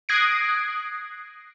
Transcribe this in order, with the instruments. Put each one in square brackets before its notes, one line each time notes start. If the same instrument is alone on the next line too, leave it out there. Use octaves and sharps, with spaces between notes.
[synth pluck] D#6 F#6 G#6 A#6 C7 D7